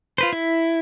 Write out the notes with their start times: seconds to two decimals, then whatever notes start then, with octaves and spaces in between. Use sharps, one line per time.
0.18 F4 B4 C5
0.33 E4